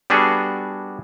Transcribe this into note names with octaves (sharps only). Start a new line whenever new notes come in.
G3 B3 D4 F#4 G#4 A4